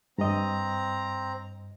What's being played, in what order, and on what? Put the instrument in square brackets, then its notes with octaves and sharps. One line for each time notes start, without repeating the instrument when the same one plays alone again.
[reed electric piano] G2 D#5 [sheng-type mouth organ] C4 A#5